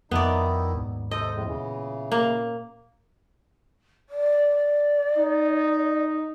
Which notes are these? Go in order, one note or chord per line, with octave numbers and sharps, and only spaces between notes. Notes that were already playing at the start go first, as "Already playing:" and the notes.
F2 D#3 B3 D#4 E4 D5
D#2 G#2 B2
C3 A4 C5 D#5
F2 A2 G#3
A#2 C#3 E3 B3 C#4
A#3
D5
D#4